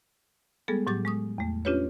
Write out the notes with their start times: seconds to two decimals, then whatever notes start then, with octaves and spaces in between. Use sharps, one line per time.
0.68 G3 G#3 B3 G#4 A4
0.87 A2 F#3 G4 D6 A6
1.05 G#3 C#6 D#6
1.38 E2 A3
1.65 C#4 D4 F4 G4 B4 C#5